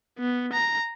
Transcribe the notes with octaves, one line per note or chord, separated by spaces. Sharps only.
B3
A#5